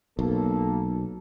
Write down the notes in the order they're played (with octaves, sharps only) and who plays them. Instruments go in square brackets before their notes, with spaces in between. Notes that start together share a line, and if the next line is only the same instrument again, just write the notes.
[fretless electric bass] B1 [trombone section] A#3 A4